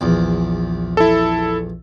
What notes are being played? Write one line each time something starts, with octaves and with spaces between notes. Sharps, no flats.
A#1 E2
E4 A4